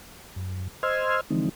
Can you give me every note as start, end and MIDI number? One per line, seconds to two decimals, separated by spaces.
0.36 0.68 42
0.83 1.21 72
0.83 1.21 75
0.83 1.21 84
0.83 1.21 88
0.83 1.21 89
0.83 1.21 92
1.30 1.49 50
1.30 1.49 52
1.30 1.49 53
1.30 1.49 56
1.30 1.49 60
1.30 1.49 63